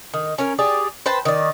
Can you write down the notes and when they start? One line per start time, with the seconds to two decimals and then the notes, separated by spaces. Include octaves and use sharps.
0.14 D#3
0.38 C#4 A#4
0.58 G4 G#4 D5
1.06 B4 C5 G5 A5
1.25 D#3 D5